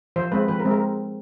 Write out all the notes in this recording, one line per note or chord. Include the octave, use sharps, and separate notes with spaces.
F3 C5
G#3 C4 B4
F3 B4
A#4
G#3 C4
A#4